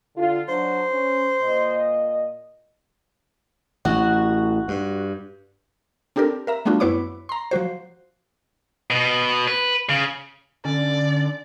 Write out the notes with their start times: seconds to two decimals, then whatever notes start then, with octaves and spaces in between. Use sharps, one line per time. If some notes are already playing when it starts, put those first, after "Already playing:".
0.16 D3 F4
0.49 F#3 D4 C5
0.90 C#4
1.42 A#2 D#5
3.85 A1 F#4
4.68 G2
6.16 C4 D4 G4 A4 A#4
6.47 A#4 E5 A#5
6.65 G3 A3 B3 D4 F4 F#4
6.80 F#2 B3 E4 B4 C#5 D6
7.29 A#5 C6
7.51 F3 F#3 F#4 C5
8.90 B2
9.48 B4
9.89 C#3
10.65 D3 C#4 D5